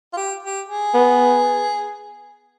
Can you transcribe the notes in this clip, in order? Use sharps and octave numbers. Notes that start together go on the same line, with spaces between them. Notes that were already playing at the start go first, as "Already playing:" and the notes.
F4
G4
G4
G#4
B3